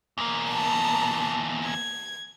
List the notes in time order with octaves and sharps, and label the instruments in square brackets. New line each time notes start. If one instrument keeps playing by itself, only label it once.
[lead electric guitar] E2 A#3
[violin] A5 A#5
G#6